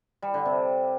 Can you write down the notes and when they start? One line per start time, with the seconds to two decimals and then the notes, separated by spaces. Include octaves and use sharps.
0.22 G3
0.34 D3
0.46 C3